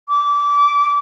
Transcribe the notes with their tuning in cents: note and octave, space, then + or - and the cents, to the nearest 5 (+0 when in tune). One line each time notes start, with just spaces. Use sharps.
D6 -20